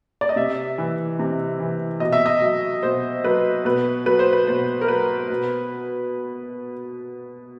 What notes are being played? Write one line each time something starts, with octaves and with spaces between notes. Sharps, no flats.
D5
D#5
C3 E5
E3
C3
E3
B2 D#5
E5
D#5
F#3
B2 C5
F#3 B4
B2 B4
F#3 B4
C5
B4
B2 C5
A#4
F#3 B4
B2